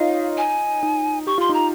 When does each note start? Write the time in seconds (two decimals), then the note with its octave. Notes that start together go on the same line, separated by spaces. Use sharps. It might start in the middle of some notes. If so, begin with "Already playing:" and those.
Already playing: D#4 F4 C#5 D#5 F5
0.37 G#5
0.83 D#4
1.27 G4 C#6
1.38 F4 C6
1.49 D#4 A#5